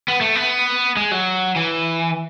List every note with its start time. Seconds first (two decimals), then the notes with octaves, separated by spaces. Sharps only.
0.08 B3
0.21 A3
0.36 B3
0.97 G#3
1.11 F#3
1.56 E3